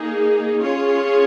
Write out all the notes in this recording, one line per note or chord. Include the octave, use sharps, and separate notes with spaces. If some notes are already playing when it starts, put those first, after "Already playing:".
Already playing: A#3 D#4 G#4
C#4 F4 G#4 C#5